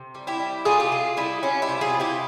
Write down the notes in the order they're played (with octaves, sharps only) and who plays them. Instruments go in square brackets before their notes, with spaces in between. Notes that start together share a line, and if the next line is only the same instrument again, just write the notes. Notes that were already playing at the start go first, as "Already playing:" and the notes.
Already playing: [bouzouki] C3
G3
E4 G4
G3
C3 F4 G#4
G4
C3 F4 G#4
G3 E4 G4
G3 C#4 F4
E4 G4
C3
F4 G#4
C3
E4 G4